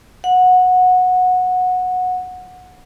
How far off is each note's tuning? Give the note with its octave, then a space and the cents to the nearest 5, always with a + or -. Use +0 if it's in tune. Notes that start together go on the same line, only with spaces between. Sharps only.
F#5 -15